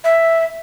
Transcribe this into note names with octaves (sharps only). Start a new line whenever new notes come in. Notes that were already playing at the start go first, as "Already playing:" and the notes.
E5